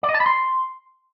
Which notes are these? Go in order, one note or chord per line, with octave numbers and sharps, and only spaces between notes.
D5
D#5
A5
B5
C6